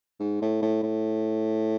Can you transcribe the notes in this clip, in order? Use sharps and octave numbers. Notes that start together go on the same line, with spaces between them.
G#2
A2
A2
A2